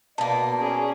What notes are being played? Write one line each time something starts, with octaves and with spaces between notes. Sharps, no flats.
B2 A#3 D5 A5
C#4 G#4